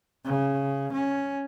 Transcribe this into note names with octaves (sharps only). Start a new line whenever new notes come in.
C#3
C#4